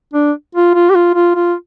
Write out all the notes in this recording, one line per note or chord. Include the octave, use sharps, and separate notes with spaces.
D4
F4
F4
G4
F4
F4
F4